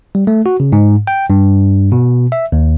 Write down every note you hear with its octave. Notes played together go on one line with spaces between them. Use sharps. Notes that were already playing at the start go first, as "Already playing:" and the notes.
G3
A3
F#4
C#3
G#2
G5
G2
B2
E5
D#2